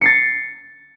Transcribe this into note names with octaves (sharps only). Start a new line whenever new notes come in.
A6 C7 C#7